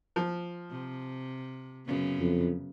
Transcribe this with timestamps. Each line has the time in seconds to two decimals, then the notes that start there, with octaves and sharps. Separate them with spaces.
0.16 F3
0.70 C3
1.86 F#2 C#3 B3
2.20 F2